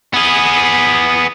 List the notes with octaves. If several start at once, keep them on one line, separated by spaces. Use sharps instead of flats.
B3 G#4